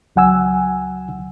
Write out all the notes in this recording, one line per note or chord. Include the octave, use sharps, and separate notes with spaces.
C#2 F#3 F#5 G#5 E6